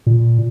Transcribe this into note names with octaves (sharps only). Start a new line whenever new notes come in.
A#2